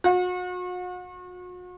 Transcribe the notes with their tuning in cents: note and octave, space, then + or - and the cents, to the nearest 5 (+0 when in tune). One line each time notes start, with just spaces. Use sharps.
F#4 -40